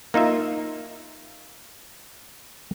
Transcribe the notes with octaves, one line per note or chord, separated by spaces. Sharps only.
A#3 D#4 F4 E5